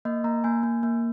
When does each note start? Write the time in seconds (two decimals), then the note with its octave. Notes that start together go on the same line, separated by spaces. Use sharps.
0.05 A#3 D#5
0.24 A#3 A#5
0.44 A#3 G#5
0.63 A#3
0.83 A#3